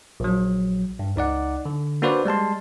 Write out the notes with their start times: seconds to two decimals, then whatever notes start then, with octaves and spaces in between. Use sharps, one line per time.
0.20 A#1 F#3
0.99 G2
1.16 C#2 D#4 D5 F#5
1.65 D3
2.02 A#3 D4 F#4 B4 C5 D5
2.25 G3 G#3 A5 C6